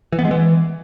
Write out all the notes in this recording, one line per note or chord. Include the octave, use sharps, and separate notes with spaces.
E3
B3
G#3
E3